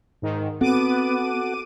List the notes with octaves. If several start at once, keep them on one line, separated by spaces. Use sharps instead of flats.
G#2 D#3
B3 C4 F#4 A4 F#5 D6 D#7